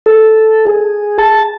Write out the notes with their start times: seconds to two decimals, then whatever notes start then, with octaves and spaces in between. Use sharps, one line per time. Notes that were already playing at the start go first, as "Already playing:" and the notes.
0.06 A4
0.67 G#4
1.18 A5